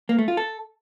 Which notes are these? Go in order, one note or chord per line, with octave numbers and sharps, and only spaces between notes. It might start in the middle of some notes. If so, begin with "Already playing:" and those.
A#3
A3
F4
A4